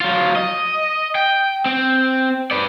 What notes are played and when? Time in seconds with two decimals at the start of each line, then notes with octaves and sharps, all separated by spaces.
0.01 F#3 F4
0.36 D#5
1.15 G5
1.66 C4
2.51 B4 D5